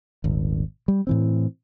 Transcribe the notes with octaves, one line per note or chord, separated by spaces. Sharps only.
D#1 G#1
G3
A2 E3 C4